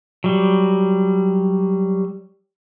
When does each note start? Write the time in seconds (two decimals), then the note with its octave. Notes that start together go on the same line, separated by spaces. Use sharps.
0.24 F#3 G3